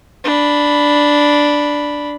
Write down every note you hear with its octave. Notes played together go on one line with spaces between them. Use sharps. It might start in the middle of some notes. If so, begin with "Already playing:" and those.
D4 B5